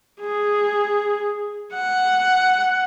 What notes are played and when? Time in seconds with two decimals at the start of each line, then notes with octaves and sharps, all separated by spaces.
0.21 G#4
1.74 F#5